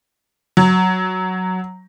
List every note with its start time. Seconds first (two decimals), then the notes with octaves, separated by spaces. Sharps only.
0.57 F#3